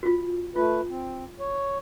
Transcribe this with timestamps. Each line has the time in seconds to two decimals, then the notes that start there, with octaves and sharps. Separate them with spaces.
0.03 F4 F#4
0.56 A3 F4 B4
0.90 C4
1.40 C#5